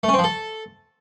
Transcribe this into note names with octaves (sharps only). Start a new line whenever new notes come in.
A3
C#4
C4
F3
A4